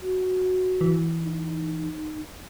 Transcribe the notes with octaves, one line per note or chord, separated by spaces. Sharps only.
F#4
E3
D#4